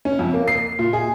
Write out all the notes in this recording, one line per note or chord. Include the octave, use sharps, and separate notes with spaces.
C#4
F2
A#3
C7
A#2
G#4